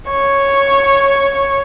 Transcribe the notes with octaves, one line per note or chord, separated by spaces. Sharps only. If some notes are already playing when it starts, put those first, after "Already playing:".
C#5 C#6